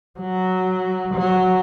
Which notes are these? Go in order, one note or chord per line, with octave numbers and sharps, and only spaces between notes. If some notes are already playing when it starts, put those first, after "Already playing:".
F#3
F#3